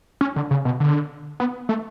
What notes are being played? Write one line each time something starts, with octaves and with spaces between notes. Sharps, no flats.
C#4
D3
C#3
B2
D3
B3
A3